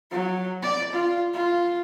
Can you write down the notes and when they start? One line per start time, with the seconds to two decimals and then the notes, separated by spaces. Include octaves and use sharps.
0.11 F#3
0.62 D5
0.92 F4
1.34 F4